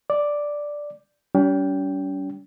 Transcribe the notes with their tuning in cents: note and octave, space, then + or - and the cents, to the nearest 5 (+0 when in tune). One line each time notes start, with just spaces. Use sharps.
D5 +0 D6 +0
G3 -30 C#4 +40 G5 +0